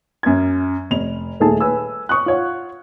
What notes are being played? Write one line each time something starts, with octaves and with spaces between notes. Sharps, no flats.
F#2 G#6
F1 F7
D#1 A3 D#4 G#4 A4 A5
B4 G#5 E6
C#6 D#6 F#6
F4 C#5 F#5